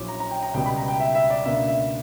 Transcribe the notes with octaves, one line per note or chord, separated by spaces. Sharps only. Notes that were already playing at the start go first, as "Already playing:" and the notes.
Already playing: A#1 A#2 F#3 C#4 E4 D6
A#5
A#5
G5
A#5
C#2 B2 G3 G5
B5
A#5
G5
E5
E5
D5
C#2 B2 A#3 D4 E5
E5